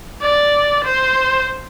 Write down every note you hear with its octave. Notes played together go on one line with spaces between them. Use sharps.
D5
C5